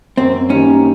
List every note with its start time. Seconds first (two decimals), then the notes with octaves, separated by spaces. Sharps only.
0.17 F#2 C4
0.50 D#3 G3 A#3 C#4